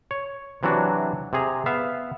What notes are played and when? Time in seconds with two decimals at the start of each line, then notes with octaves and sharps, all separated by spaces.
0.11 C#5
0.63 C3 E3 F#3 D4 F#4
1.33 C3 G#4 A#5
1.66 B3 E5 F5